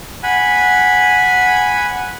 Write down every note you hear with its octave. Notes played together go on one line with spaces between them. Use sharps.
F#5 G#5 B5